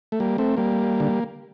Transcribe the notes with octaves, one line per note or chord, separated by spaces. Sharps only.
A3
G3 A#3
A3 C4
G3 A#3
D3